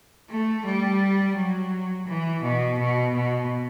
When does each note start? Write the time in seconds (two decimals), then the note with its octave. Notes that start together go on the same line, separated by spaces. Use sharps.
0.29 A3
0.65 G3
1.35 F#3
2.07 E3
2.43 B2
2.78 B2
3.15 B2